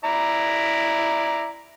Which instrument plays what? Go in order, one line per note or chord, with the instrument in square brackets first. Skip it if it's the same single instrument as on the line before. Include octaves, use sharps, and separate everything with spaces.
[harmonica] E4 D5 A#5